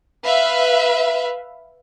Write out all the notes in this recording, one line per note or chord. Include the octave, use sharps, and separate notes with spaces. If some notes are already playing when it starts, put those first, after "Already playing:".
B4 E5 F5